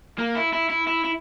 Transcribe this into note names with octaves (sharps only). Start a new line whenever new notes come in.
A#3
E4
E4
E4
E4
E4